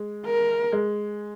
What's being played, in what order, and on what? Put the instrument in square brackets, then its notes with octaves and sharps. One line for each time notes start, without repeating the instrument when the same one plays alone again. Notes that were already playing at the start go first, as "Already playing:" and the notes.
Already playing: [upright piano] G#3
[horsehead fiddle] A#4
[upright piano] G#3